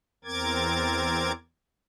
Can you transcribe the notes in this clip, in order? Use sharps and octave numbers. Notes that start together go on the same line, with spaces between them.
E2 C4 A#4 D6 G#6 A6